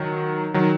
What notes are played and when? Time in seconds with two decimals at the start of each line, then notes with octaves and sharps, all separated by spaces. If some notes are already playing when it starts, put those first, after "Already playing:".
Already playing: D#3 F#3
0.54 D#3 F#3